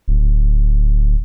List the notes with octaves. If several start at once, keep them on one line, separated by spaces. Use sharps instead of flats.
D1